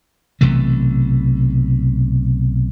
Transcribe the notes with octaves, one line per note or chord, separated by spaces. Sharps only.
B1 C3 E3 A3